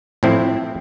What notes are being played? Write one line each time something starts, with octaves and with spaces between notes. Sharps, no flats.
A2 F3 C4 E4